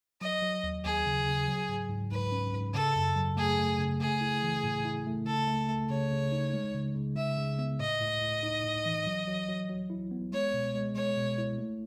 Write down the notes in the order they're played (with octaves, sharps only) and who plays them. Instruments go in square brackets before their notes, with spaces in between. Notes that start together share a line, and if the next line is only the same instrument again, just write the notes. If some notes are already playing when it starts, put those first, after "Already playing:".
[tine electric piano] F#3 [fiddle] D#5
[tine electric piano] F#3
D#2
[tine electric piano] D#2 [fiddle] G#4
[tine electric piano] C#3
C#3
F#3
G#2
G#2
[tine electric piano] G#2 [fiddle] B4
[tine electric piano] C#4
G#2
[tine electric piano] C#3 [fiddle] A4
[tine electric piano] F#2
F#3
[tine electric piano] A3 [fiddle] G#4
[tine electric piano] A3
C#3
[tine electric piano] A3 [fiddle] G#4
[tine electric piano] E4
E3
A2
E4
A3
[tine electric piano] C#3 [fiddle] A4
[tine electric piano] A3
A3
[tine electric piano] C#3 [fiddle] C#5
[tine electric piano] C#3
D#4
G#3
C#3
C#3
[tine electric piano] C#3 [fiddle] E5
[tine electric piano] C#3
B3
[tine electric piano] A2 [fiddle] D#5
[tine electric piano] A2
A2
D#4
A2
E3
F#3
F#3
F#3
F#3
E4
B3
[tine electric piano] G#3 [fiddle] C#5
[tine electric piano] B2
G#3
[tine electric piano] G#3 [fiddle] C#5
[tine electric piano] B2
E4
A3